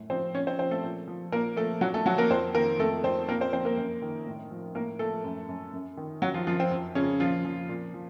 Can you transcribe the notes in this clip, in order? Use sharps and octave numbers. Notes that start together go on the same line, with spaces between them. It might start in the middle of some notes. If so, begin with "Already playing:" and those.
Already playing: F#2 A2
F3 C4 C5
A#2 C#4 C#5
C4 C5
F3 C4 C5
A3 A4
A#2
F3
A#2 A#3 A#4
F3 A3 A4
A#2 F#3 F#4
A3 A4
F3 F#3 F#4
A#3 A#4
F2 C4 C5
D#3 A#3 A#4
F2 A3 A4
F2 C4 C5
A#2 A#3 A#4
C4 C5
F3 C4 C5
A#3 A#4
F#2
D#3
A2
F3
A2 A#3 A#4
F3 A3 A4
F#2
F#2
F#2
D#3
F#2 F#3 F#4
F3 F4
F#2 F3 F4
C4
F2
F2 C#3 C#4
A#2 F3 F4
F3
A#2
F3